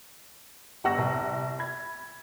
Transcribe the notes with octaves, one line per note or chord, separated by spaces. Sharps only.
G1 G4 F#5 C#6 E6 A#6
C2
B5 G#6